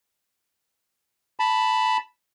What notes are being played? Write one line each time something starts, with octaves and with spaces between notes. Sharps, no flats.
A5 B5